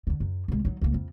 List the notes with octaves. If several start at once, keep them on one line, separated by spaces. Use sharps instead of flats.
E2 D3
F#2
C2 G#3
F#3 D#4
C#2 A#3
F2